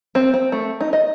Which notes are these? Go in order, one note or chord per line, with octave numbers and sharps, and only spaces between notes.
C4
C4
A3
D#4
D#5